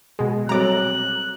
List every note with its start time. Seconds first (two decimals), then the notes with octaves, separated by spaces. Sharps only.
0.19 B2 G#3
0.49 F#3 G3 C4 A4 C#5 A#5 D6 F#6